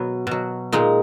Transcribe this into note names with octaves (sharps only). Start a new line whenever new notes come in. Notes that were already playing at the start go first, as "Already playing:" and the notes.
Already playing: B2 F#3 B3
B2 F#3
A#2 G#3 D#4